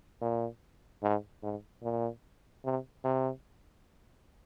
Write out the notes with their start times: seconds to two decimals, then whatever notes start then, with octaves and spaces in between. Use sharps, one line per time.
0.22 A#2
1.03 G#2
1.43 G#2
1.83 A#2
2.65 C3
3.05 C3